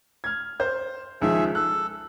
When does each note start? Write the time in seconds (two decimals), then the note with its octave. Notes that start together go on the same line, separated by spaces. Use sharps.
0.24 F6 G#6
0.60 C5 G6
1.22 C#2 D#3 F3 G#4 E5
1.55 A4 F#6